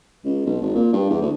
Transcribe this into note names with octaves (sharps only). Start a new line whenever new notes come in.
C#2
B1
G#1
A#2
G2
E2
D2